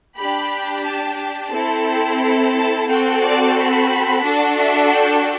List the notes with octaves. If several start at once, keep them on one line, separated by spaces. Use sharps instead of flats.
D4 G4 B5
A5
A5
C4 E4 A4
A5
C4 F#4 A4 G5
D5
B5
D4 F#4 A4 A5
E5
G5